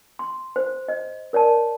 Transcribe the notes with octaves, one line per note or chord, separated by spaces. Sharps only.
C6
C5
D#5
A#4 C#5 D5 A5